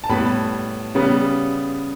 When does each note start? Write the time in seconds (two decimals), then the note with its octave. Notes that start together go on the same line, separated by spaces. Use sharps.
0.04 A5
0.09 A2 G3 B3 B5
0.95 C#3 G3 B3